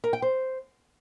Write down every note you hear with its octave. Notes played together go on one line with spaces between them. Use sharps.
A#4
G5
C5